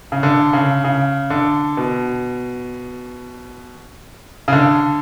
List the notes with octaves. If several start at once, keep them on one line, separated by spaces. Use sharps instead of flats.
C#3
D3
C#3
C#3
D3
B2
C#3
D3